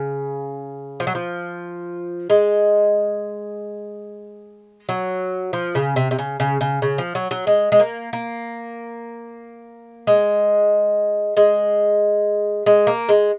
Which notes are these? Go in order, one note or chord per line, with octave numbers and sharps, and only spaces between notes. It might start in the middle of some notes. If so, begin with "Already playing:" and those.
Already playing: C#3
F3
F#3
F3
G#3
F#3
F3
C#3
C3
C3
C#3
C#3
C#3
C#3
F3
F#3
F#3
G#3
G#3
A#3
A#3
G#3
G#3
G#3
A#3
G#3